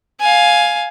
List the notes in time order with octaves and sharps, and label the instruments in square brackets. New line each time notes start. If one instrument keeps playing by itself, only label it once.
[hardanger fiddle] F5 G#5